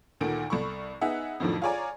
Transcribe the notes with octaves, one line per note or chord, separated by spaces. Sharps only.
D2 A#2 D#3 A4 D7
C2 A4 B5 C#6
B3 D#4 G#4 E5 F#5
F2 A2 D#3 F3 F#3 D4
F4 G#4 C#5 D5 G#5 A#5